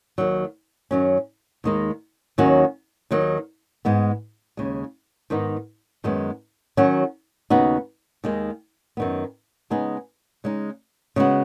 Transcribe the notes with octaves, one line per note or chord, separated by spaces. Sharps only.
D#2 D#3 F#3
F#2 D#3 F#3 C#4
D#2 D#3 G#3 D#4
D#2 D#3 F#3 C#4 F#4
D#2 D#3 F#3
G#2 G#3 B3
D#2 C#3 G#3
G#2 D#3 B3 D#4
F#2 D#3 G#3 B3
D#3 F#3 C#4 F#4
D#2 C#3 B3 D#4 F#4
D#2 D#3 G#3
F#2 D#3 B3
C#3 G#3 B3 D#4 G#4
C#3 G#3 D#4
C#3 G#3 B3 F#4